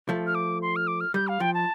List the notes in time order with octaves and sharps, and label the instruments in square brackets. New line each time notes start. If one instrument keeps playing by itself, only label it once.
[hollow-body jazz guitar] F3 A3
[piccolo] F6
D6
C6
F6
D6
F6
[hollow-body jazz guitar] G3 [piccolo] G6
[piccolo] F5
[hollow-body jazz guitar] F3 [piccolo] G5
[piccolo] A5